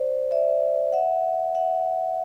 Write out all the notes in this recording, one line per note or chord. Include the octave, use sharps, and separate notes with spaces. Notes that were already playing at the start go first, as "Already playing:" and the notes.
Already playing: C5 D5
D5 E5
E5 F#5
E5 F#5